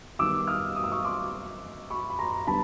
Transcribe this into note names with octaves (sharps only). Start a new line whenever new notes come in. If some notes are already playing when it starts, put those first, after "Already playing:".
D#3 G3 B3 D6 E6
D#6 F6
D#6
E6
C#6 D#6
C6 D6
B5 C#6
B5
A#5 C6
D3 G3 B3 A5 B5